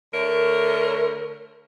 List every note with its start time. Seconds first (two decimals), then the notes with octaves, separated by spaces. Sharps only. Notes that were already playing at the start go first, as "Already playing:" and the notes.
0.14 D3 A3 A#4 C#5